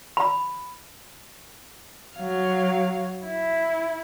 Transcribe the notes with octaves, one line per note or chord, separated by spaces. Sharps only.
B5
F#3 F5
E4